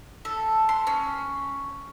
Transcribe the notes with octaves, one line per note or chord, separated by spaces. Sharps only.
A4
C6
C#4